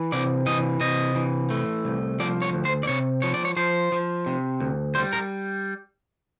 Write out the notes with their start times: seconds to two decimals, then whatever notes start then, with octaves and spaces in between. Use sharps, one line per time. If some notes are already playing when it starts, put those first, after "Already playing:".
Already playing: E3
0.12 C3 D5
0.46 E3 D#5
0.80 C3 D#5
1.15 E3
1.50 A3
1.85 C2
2.20 F3 D5
2.42 C#5
2.53 D2
2.65 C5
2.83 D5
2.87 C3 C#5
3.22 F3 C#5
3.34 D5
3.45 C#5
3.56 F3 C5
3.92 F3
4.26 C3
4.60 D2
4.95 G3 C5
5.13 A#4